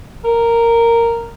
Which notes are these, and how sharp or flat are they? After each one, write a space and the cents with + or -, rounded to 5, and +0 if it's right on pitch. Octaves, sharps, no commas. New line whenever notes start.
A#4 -5